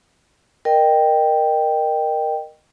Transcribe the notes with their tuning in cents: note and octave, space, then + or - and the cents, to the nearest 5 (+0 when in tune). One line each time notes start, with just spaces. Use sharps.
A#4 +0 D#5 -25 G5 +0